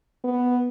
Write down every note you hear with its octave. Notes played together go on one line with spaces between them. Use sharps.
B3